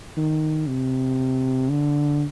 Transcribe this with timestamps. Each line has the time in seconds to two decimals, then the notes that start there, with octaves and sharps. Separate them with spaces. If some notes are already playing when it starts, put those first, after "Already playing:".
0.17 D#3
0.67 C3
1.70 D3